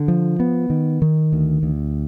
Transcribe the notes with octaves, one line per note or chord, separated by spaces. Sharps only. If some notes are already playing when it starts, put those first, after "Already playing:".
Already playing: D3
F3
B3
D#3
D#3
D2
D2